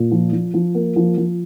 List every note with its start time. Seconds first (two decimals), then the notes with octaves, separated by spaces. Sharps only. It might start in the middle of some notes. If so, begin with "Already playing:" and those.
Already playing: A#2
0.11 F3
0.32 F3
0.54 F3
0.75 A#3
0.96 F3
1.17 F3